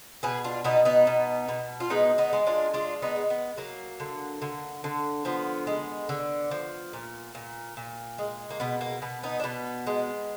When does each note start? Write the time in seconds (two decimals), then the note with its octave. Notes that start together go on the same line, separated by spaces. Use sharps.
0.23 B2 G#4 B4
0.44 D4 F4
0.64 B2 B3 D#4
0.85 B3 D#4
1.07 B2
1.48 B2
1.80 F4
1.90 G#3 B3 D#4
2.18 B3 D#4
2.33 G#3
2.47 D4 F4
2.74 G#3 D4 F4
3.02 B3 D#4
3.16 G#3
3.30 B3
3.57 F#3 A#3
4.00 D3
4.42 D3
4.84 D3
5.25 F3 B3
5.67 G#3
6.09 D3
6.51 F3
6.93 A#2
7.35 A#2
7.77 A#2
8.18 G#3
8.50 A#3
8.60 B2 B3
8.81 A#3
9.02 B2 B3
9.23 B3 D#4
9.40 D4
9.44 B2 B3
9.87 G#3